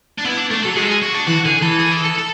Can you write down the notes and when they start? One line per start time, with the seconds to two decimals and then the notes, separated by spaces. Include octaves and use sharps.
0.18 D4
0.25 B3 E4
0.37 D4
0.50 A3 D4
0.63 F#3 A4
0.76 G#3 G#4
0.83 A4
0.89 G#4
1.02 F#4
1.15 D4
1.27 E3 F#4
1.45 D3 G#4
1.62 E3 A4
1.79 G#4
1.92 A4
2.05 A4
2.18 A4